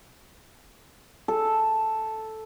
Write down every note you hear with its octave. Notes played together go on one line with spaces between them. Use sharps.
A4